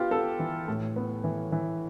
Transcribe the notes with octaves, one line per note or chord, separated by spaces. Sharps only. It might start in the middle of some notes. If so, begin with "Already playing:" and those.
Already playing: B3 F4 G4
B3 A4
E3
A2
B3
E3
E3